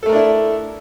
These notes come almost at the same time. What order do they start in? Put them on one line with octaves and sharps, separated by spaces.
A4 A3 A#4 D4 E4